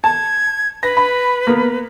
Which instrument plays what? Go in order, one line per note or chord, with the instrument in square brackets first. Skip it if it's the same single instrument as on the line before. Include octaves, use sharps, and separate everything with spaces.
[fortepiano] A5 [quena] G#6
[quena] B4 [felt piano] A#6
[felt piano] B5
[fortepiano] A#3 B3